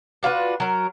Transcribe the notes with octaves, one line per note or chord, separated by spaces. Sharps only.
D4 F4 F#4 B4
F#3 A#4